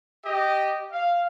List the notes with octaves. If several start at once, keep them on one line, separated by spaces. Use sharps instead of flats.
G4 D#5
F5